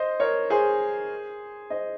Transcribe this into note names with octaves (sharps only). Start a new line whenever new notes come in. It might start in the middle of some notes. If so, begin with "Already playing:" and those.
Already playing: C5 D#5
A#4 C#5
G#4 C5
C5 D#5